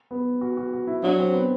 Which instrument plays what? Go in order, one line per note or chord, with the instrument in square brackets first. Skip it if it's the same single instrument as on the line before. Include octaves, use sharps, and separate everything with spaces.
[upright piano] B3
F#4
F#4
F#4
E4
[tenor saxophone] F#3 [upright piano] D4
[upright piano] C4
B3